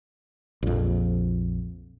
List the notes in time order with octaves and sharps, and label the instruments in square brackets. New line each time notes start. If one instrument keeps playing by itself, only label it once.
[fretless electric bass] A#1 F2